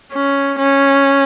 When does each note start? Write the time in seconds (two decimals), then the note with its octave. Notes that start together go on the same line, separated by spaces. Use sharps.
0.13 C#4
0.58 C#4